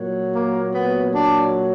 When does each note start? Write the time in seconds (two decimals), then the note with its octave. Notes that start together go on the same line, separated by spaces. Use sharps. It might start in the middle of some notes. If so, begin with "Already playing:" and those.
Already playing: A#2 F#3
0.33 A#3
0.73 B3
1.13 D4